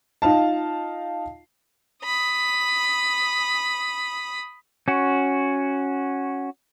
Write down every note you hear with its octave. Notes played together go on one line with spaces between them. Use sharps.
D#4 F4 F5 A5
B5 D#6
C#4 F#4